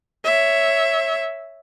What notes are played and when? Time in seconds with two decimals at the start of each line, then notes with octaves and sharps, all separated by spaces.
0.24 C#5 E5